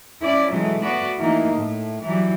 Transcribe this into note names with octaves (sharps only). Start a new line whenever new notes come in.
C#4 E4 D5
B2 E3 F#3 G#3 A3
A3 B3 F#4 B4 D5
E3 A3 A#3 D#4
A2
E3 F#3 G3